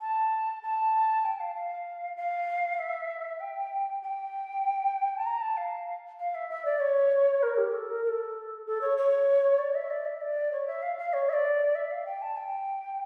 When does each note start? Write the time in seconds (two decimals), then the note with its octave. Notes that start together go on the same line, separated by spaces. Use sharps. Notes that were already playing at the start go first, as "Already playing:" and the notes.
0.01 A5
0.62 A5
1.24 G5
1.39 F5
1.55 F5
2.16 F5
2.78 E5
3.40 G5
4.02 G5
5.17 A5
5.26 A#5
5.41 A5
5.57 F5
6.19 F5
6.34 E5
6.49 E5
6.65 D5
6.80 C#5
7.42 A#4
7.57 G4
7.73 A4
7.89 A#4
8.04 A#4
8.08 A4
8.66 A4
8.81 C#5
8.97 C#5
9.58 D5
9.74 E5
9.90 D5
10.05 E5
10.20 D5
10.52 C#5
10.67 E5
10.82 F5
10.98 F5
11.13 C#5
11.29 E5
11.33 D5
11.75 E5
11.91 F5
12.05 G5
12.21 A5
12.36 G5